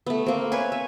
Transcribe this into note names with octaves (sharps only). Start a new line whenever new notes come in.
A3 B3
A#3 C4
B4 C#5 G#5
E5